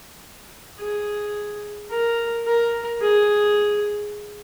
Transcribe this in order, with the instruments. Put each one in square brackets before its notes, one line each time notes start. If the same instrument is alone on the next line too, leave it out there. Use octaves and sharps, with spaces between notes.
[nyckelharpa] G#4
A#4
A#4
G#4